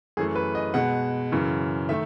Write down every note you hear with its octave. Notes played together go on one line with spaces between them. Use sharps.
F#2 E3 A3 G#4
B4
D#5
B2 G#3 F#5
F#2 C#3 E3
D#3 A3 E5